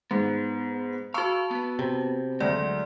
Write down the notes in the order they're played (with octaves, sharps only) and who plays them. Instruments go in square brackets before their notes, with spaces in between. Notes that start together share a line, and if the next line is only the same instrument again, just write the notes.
[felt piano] G#2 [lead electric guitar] B3
[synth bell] F#4 A5 [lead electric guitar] F5 [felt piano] C#6 E6
[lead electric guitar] B3 B4
[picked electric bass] C3
[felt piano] D2 [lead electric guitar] F#3 G#3 [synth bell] D5